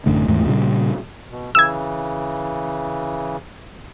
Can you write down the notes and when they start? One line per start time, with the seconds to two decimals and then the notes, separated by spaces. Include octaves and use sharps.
0.06 A1 F#2 D3 A3
0.28 D#2 G#2 E3 A3
0.46 A#2 C#3 F3 G3
1.31 B2
1.55 C#3 E3 E6 G#6